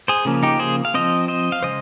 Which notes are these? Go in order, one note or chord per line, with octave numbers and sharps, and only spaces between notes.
G#4 C5
C#3 F3 A#3 C#4
D#4 G4
G#4 C5
F5
F3 C4 C5 D#5
C5 D#5
F5
C#3 G#3 C5 D#5